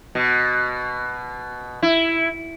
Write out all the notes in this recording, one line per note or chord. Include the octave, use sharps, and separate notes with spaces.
B2
E4